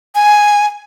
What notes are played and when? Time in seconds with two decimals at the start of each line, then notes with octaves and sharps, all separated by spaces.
0.15 G#5